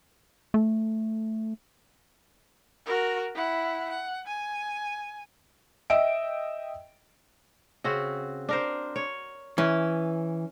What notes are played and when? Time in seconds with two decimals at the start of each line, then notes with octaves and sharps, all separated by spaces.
0.54 A3
2.86 F#4 A#4
3.35 E4 F#5
3.90 F#5
4.27 G#5
5.90 D#5 E5 G5 E6 D7
7.84 C#3 C4 F#4
8.49 D4 A#4 C5
8.96 C#5
9.58 E3 C#4